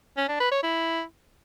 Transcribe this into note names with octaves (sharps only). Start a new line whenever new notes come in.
C#4
D4
B4
C#5
E4